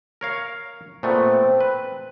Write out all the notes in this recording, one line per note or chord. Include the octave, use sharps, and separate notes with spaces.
A#4 C#5 F5
A#2 A3 B3 C4
B4